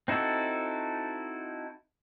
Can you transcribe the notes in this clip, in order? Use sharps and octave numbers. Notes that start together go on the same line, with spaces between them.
C4 D#4 E4 F#4 A4